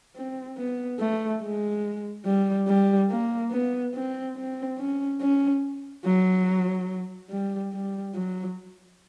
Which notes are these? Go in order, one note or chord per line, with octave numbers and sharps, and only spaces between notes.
C4
B3
A3
G#3
G3
G3
A#3
B3
C4
C4
C#4
C#4
F#3
G3
G3
F#3